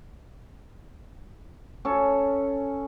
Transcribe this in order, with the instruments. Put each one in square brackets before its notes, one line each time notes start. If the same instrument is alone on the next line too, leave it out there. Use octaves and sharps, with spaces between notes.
[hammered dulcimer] C#4 A4